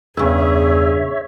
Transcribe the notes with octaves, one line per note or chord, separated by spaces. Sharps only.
E2 G2 C#3 G#4 C#5 E5